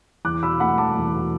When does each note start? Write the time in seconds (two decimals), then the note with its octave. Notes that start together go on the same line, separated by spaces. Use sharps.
0.25 E2 D6 F#6
0.43 B2 B5 E6
0.60 A3 F#5 B5
0.78 E1 A5 D6
0.96 E2
1.13 B2